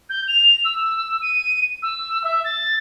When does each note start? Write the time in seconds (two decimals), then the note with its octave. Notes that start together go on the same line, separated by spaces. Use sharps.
0.09 G6
0.28 F7
0.65 E6
1.22 D#7
1.82 E6
2.24 E5
2.44 A6